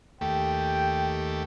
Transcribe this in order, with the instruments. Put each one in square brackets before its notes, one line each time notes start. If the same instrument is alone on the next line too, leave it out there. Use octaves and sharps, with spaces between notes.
[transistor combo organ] D#2 A3 G4 [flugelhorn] G5